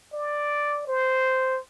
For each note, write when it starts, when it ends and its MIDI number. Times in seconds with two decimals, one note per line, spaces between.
0.14 0.83 74
0.87 1.59 72